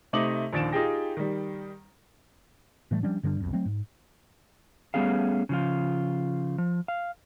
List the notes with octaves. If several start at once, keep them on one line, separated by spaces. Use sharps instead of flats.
C3 A3 D#4 D6 F#7
A#1 D#2 A6 D7 E7
D#4 F4 G4 G#4 G5 A#6
D#3 G3
A2 E3 G3 A3
F3 G3 C#4 D4
G2 D3 G3 D4
B1 F2
F#3 A3 C4
G#2
G3 A3 B3 C#4 G#4 F5
C#3 F3 F4
F3
F5